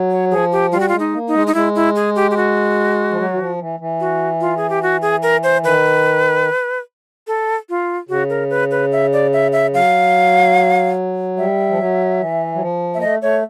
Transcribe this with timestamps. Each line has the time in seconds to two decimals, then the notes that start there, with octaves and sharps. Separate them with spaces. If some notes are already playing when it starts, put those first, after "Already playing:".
Already playing: F#3
0.11 C#5
0.31 F3 G#4
0.52 G4
0.72 G3 F4
0.80 F#4
0.88 F4
0.92 G#3
0.99 D#4
1.13 A#3
1.27 D#4
1.34 G#3
1.47 D#4
1.54 G#3 E4
1.75 E4
1.96 G#4
2.15 G4
2.31 G4
2.37 F#4
3.11 F3
3.18 F#3
3.34 E3
3.38 F3
3.59 E3
3.80 E3
4.00 F#4
4.41 F4
4.57 G#4
4.70 G4
4.83 F#4
5.02 G#4
5.22 A#4
5.43 C5
5.63 D#3 B4
7.27 A4
7.69 F4
8.09 C#3 F#4
8.30 A#4
8.50 B4
8.71 B4
8.92 E5
9.13 D5
9.33 E5
9.52 E5
9.74 F#3 F5
11.37 G3 E5
11.70 F3
11.78 F#3
12.20 E3
12.55 F#3
12.61 F3
12.94 A#3 E5
13.01 A3 D#5
13.22 A3 C#5